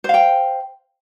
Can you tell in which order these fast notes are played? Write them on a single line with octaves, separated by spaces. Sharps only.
C5 F5 G5